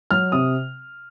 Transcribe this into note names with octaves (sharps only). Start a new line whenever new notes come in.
F#3 F6
C3 D#6